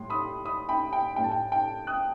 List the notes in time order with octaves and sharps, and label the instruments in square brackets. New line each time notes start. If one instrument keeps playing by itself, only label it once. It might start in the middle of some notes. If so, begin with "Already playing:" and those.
Already playing: [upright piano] A2 G3 C6
B5 D#6
B5 D#6
G5 B5
G5
A2 G3 G5
A5
G5
G5
D#6 F#6